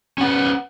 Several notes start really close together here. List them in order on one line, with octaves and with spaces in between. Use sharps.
C#4 F#5 B4